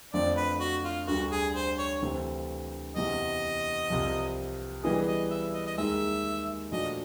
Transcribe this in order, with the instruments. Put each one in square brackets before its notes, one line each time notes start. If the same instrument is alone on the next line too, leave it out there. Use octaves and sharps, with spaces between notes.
[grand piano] F2 D3 F3 A3 C4 [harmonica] D5
[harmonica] B4
F#4
F4
[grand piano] D2 D3 G3 [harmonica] F#4
[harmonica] G#4
C5
C#5
[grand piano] D2 C3 E3 A3 C4
[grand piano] E2 C3 E3 [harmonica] D#5
[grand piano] C2 C3 F3
[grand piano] E3 G3 B3 E4 G#4 [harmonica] D#5
[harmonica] D#5
E5
D#5
D#5
[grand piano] D#2 D#3 G#3 [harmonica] E5
[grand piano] A#2 F3 A3 D4 F#4 [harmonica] D#5